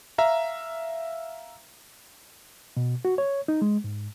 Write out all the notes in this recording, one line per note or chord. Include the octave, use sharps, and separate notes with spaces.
E5 F5 A#5
B2
F#4
C#5
D#4
G#3
G#2